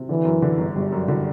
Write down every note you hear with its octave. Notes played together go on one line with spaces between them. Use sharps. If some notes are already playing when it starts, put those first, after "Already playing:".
Already playing: C3
D3 E3
F#2
D3
G1
G1 G3
F#2
D3